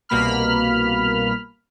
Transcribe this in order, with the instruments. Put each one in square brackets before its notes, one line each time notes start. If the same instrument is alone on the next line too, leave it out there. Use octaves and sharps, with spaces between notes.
[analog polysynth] C2 B2 A#3 B5 F6